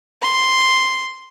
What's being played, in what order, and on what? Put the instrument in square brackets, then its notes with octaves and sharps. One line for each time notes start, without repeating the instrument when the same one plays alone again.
[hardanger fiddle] C6